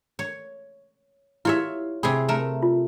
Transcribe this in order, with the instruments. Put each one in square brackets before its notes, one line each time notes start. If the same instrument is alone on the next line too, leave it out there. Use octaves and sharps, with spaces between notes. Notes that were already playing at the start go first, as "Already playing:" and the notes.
[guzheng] C#5
[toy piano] E4 G4 [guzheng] F4 C#5 E5
[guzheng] C3 G#4 [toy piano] B5
[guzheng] A3 A#4
[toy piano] F4